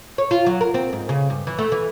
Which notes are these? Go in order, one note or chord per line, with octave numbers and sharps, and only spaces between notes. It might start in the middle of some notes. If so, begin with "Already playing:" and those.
C#5
F4
F#3
A#4
C4
G#2
C#3
G2
E3
A3
E3